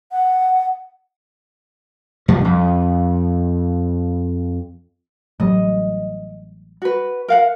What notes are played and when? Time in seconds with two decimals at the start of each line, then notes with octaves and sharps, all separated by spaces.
0.11 F#5
2.28 C2 G2 F3 G3
2.45 F2
5.40 A1 F#3 G3 D#5
6.82 F#4 B4
7.28 A#4 F5 F#5